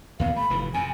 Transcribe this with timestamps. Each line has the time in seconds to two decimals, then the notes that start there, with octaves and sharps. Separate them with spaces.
0.20 D#2 A#2 B3 F5
0.36 A3 B5
0.50 F1 G#2 E3
0.74 F2 C3 G#5